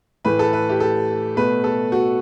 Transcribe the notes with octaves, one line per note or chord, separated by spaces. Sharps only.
A2 E3 A3 B4
A4
B4
G4
A4
B2 A3 B4
A4
F#4